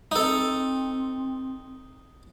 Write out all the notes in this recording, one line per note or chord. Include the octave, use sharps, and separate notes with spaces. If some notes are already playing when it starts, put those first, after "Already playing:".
C4 D#4 A4